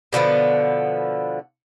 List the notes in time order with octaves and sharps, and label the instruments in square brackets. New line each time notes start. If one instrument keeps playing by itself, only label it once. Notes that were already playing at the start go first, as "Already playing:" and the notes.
[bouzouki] B2 D3 F3 B3